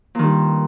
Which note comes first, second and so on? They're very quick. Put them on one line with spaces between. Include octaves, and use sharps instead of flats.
A#2 D#3 G2